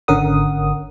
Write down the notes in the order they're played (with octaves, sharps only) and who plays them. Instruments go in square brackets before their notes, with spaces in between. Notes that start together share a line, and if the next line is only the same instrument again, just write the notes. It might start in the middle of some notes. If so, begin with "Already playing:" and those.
[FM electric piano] G#1 D3 C#4 A#4 F#5 D#6